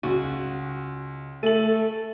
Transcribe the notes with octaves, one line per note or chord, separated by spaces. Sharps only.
C#2 F#4
A3 A4 D#7 F#7